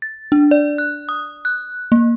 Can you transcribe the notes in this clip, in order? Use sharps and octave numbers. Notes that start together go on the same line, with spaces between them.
A6
D4
D5
F#6
D#6
F#6
A#3